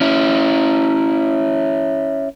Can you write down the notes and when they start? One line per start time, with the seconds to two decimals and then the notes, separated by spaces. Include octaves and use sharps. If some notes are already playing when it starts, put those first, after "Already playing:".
0.01 C#4 E4